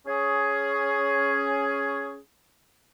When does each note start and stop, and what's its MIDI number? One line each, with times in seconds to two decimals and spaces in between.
0.07 2.17 61
0.07 2.17 68